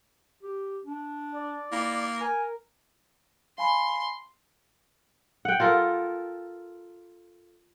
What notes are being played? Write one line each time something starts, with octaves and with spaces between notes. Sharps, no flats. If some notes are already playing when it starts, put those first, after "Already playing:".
G4
D4
D5
A#3 E4
A#4 G#5
F5 G#5 B5 C6
F#5 G5
F4 A4 A#4